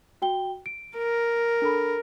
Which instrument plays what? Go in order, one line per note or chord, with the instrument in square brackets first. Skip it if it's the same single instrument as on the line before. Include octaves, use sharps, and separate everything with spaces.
[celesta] F#4 G5 G7
D7
[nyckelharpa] A#4
[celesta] D4 A4 B5